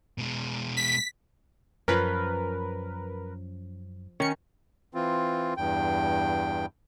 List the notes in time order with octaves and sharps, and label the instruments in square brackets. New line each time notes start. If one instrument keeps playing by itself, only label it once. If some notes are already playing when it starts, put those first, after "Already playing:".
[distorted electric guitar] B2 G#3
[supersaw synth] B6
[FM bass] F#2 [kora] F3 C#4 [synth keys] A#4 B4
[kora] D#3 [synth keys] C#4 C#7
[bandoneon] E3 C4 F4
E2 G2 G5